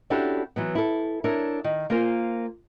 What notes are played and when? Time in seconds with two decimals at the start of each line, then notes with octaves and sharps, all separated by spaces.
0.10 C#4 D4 E4 F#4 G4 A4
0.56 E3 F#3 B3
0.75 E4 A4
1.24 D4 E4 A#4 C#5
1.64 D#3
1.90 A#3 F4 A#4 C5 G#5